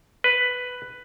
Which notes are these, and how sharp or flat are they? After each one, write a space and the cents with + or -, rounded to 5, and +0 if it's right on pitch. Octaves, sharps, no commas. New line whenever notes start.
B4 +5